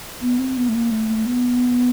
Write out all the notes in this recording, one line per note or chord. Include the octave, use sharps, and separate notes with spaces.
B3
C4
B3
A3
A#3
A3
B3